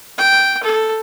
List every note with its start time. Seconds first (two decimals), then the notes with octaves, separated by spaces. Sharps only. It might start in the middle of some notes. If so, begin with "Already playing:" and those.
0.18 G5
0.63 A4